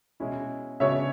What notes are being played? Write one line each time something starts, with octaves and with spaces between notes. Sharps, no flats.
B2 G#3 C#4 E4
C#3 G#3 B3 D4 F#4 C#5 E5